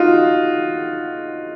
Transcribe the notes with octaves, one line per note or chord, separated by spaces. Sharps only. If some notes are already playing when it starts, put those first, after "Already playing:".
Already playing: D#4 F4 F#4